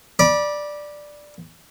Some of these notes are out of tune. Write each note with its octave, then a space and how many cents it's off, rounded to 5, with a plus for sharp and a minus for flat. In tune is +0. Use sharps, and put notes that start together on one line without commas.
D5 +5 B5 -30